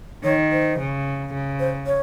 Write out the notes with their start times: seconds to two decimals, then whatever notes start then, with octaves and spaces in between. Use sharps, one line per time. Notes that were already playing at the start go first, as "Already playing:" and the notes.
0.24 D#3 C#5
0.52 C5
0.79 C#3
1.33 C#3
1.60 C5
1.87 C#5